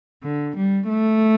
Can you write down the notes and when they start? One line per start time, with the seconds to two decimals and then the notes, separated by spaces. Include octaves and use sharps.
0.23 D3
0.56 G3
0.89 A3